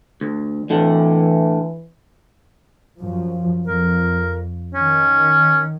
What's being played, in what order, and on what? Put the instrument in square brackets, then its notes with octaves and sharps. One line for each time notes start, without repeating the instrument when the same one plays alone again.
[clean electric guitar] D2
[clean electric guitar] A2 D3 [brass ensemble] E3
[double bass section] F#2 F3
[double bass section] F2 [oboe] A#4
[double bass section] D#3 [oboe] C#4